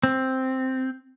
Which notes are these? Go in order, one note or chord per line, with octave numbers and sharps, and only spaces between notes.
C4